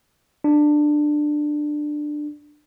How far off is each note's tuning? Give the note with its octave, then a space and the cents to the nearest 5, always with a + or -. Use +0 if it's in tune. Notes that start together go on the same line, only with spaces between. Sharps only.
D4 +15